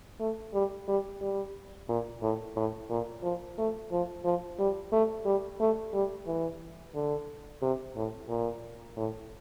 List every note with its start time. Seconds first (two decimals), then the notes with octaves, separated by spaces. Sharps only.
0.20 A3
0.54 G3
0.88 G3
1.21 G3
1.89 A#2
2.22 A2
2.56 A2
2.90 A#2
3.23 F3
3.58 A3
3.92 F3
4.24 F3
4.59 G3
4.92 A3
5.25 G3
5.60 A3
5.94 G3
6.27 E3
6.95 D3
7.62 C3
7.96 A2
8.28 A#2
8.97 A2